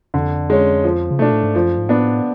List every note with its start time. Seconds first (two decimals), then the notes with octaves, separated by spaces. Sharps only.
0.14 F2 D3
0.50 G#3 C#4
0.84 F3
1.11 C#3
1.19 B2 A3 D4
1.32 A2
1.43 G#2
1.55 F#2 F3
1.78 G#2
1.89 A2 B3 D4